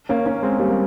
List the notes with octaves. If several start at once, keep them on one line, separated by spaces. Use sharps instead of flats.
A#3 C#4
A#3 C#4
G#3 C4
G3 A#3
A#3